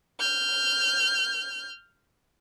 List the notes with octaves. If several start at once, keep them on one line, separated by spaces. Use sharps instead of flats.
F6 G6